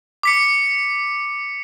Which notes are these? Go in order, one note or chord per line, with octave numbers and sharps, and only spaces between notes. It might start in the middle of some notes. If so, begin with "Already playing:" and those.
D6 B6 C#7